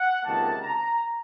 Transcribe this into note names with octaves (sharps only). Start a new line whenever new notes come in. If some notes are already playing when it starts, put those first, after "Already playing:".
Already playing: F#5
C#2 C3 D#3 A#3 A5
A#5